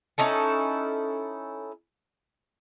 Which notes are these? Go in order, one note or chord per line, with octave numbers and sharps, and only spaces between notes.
C#4 D#4 E4 A4